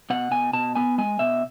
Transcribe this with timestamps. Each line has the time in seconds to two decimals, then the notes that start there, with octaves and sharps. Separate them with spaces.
0.10 B2 F#5
0.31 B2 G#5
0.53 B2 A5
0.75 B3 G#5
0.98 G#3 G#5
1.19 B2 E5